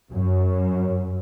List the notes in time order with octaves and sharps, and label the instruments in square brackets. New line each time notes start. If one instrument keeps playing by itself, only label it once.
[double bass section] F#2